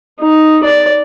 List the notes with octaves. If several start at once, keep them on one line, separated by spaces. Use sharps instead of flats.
D#4
D5